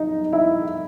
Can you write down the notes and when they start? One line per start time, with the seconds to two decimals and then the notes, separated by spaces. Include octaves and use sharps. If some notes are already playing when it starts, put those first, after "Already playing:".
Already playing: D#4 D#5
0.33 E4 E5